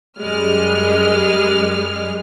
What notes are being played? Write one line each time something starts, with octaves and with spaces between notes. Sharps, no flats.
F#2 G3 G#3 F6